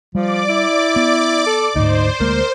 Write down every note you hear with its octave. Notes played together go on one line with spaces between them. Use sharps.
F3 G3 D5 D6
E4
B3
A4
D2 G#2 D#4 C5
D2 G#3 A#3 A#4